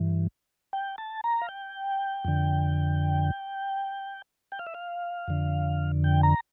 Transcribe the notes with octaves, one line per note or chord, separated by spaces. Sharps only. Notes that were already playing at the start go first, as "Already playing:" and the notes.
Already playing: G2 E3
G5
A5
A#5
F5
G5
F2 D3
G5
F5
E5
F5
F2 D3
G5
A#5